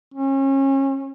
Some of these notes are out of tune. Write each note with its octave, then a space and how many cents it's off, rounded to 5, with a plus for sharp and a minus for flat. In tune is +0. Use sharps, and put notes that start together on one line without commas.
C#4 -30